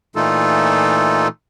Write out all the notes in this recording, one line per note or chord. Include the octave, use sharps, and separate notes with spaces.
A#2 E3 A3 D#4 F4 A4